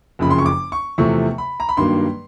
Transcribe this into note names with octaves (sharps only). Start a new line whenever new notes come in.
F#1 F2 C#3 B5
C6
C#6
D6
C#6
E2 C3 F3 A3 C#6
B5
A#5
B5
G2 D#3 F#3 A#3 C6